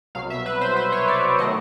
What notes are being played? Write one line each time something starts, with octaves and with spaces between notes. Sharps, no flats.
C2 B2 F#3 F5
E5
B4
C5
C5
C#5
D5
D#3 F#3 A3 D#5